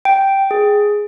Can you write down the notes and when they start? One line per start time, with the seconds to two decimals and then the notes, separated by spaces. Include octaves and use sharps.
0.05 G5
0.51 G#4